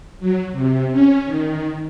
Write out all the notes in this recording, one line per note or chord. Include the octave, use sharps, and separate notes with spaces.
F#3
C3
C#4
D#3